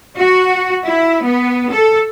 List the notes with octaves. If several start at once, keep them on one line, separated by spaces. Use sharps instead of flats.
F#4
E4
B3
A4